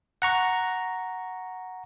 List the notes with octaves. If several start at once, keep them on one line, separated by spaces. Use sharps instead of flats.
F#5 A#5 C#6